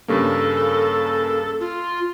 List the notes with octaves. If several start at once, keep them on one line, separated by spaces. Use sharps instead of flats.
G2 C#3 A#3 A4
F4